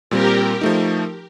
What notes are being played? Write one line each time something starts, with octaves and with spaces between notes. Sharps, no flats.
A#2 G3 C4 G4 A#4
F3 A3 D#4